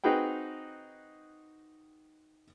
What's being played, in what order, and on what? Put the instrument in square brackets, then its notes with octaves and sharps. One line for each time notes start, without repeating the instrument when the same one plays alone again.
[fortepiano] C4 D#4 F#4 G#4 B4 G5